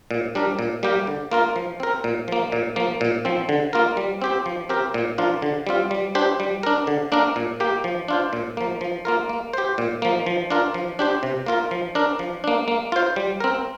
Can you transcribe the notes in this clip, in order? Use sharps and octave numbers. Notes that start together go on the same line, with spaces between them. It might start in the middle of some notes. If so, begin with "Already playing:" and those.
A#2
G3 D4 A#4
A#2
G3 A#3 G4 A#4
D3
A#3 F4 A#4
F3
C4 A#4
A#2
F3 A#3
A#2
F3 A#3
A#2
F3 C4
D3
A#3 F4 A#4
G3
C4 G4 C5
F3
C4 G4 A#4
A#2
F3 D4 F4 A#4
D3
G3 C4 F4
G3
D4 G4 C5
G3
D4 A#4
D3
A#3 D4 A#4
A#2
A#3 G4
F3
D4 F4 C5
A#2
F3 A#3
F3
A#3 F4 A#4
A#3
G4 C5
A#2
F3 A#3
F3
D4 F4 A#4
F3
D4 G4 C5
C3
A#3 F4 A#4
F3
D4 A#4
F3
A#3 D4
A#3
F4 C5
G3
C4 A#4